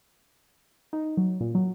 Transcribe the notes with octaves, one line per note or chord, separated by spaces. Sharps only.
D#4
F#3
A#2
F#3